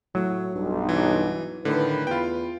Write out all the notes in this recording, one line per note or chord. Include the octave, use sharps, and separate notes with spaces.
A2 F#3
B1 G2
E3
A2 D3 D#3 B4
E2 F4 G5